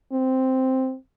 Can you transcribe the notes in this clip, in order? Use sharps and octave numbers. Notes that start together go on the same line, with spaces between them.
C4